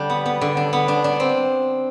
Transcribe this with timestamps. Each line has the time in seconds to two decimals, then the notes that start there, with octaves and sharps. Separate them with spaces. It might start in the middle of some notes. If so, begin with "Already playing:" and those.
Already playing: D3 G3 D4
0.10 B3
0.26 B3
0.41 D3
0.57 D4
0.73 B3
0.88 D4
1.04 D4
1.20 C4